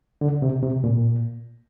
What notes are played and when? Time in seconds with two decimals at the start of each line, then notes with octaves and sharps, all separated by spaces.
0.21 D3
0.42 C3
0.63 C3
0.84 A#2